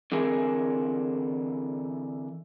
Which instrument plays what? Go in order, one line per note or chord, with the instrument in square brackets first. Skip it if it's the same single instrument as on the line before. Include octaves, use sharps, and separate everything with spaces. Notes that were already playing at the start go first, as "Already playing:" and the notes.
[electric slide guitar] D3 E3 C4 E4 G#4 A#4